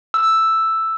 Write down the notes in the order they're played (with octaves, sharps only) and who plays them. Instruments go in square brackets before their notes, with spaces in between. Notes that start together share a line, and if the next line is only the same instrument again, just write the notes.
[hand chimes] E6